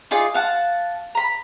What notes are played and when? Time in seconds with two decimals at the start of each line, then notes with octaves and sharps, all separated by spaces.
0.11 D#4 F4 G#4 D5
0.34 F5 F#5 A5
1.15 A#5 B5